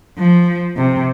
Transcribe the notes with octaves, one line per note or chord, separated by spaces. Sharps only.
F3
C3